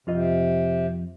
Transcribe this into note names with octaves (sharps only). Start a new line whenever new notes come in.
F2 C3 F4 D#5